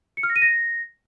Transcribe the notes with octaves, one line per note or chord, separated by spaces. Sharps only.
C#7
F6
A#6
D#7
A#6